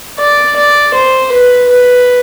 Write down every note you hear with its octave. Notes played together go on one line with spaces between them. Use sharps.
D5
D5
C5
B4
B4